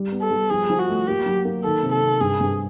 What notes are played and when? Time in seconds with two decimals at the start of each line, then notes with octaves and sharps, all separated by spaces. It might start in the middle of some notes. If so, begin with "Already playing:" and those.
Already playing: G3
0.12 B3
0.22 A4
0.31 G3
0.50 F3 G#4
0.70 F3
0.79 F#4
0.89 A3
1.07 A#3 G4
1.26 F#3
1.45 A#3
1.64 D#3 A4
1.83 C3
1.93 A4
2.02 C3
2.21 G2 G#4
2.40 G2